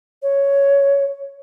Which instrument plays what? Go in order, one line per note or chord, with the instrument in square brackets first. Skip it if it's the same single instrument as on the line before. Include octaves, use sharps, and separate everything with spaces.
[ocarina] C#5